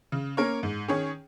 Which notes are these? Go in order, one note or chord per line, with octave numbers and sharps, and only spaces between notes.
C#3
A#3 C#4 A#4 C#5
G#2
D#3 C#4 G#4 C#5